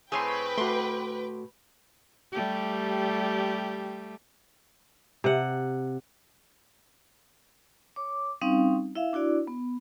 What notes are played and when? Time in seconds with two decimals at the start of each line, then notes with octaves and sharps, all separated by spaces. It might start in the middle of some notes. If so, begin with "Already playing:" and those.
0.12 A2 A3 C4 G#4 B4 C#5 G5 C6
0.58 A3 F#4 C6 D6
2.32 G3 A3 G4
5.24 C3 F#5
7.96 C#5 D6
8.41 G3 C4 C#4 D#4 F5
8.95 E4 E5 F5
9.13 D4 E4 F#4 D5
9.47 B3